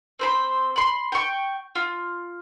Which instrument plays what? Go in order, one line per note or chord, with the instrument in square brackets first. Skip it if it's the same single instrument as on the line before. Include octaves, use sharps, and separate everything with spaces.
[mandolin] C4 C5 B5
B5 C6
G5 C#6
F4